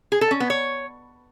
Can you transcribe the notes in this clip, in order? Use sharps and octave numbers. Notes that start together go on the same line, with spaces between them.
G#4
A4
C#4
B3
C#5